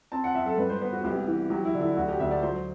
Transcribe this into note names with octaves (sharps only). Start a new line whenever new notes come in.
C4 A5
F#5
F#2 E5
A4
G2 B4
C5
B3 B4
F#4
C2 G4
E3
F#3 G4
E4
D3
E4
D2 F#4
G4
D2 E5
D5
F#3 C5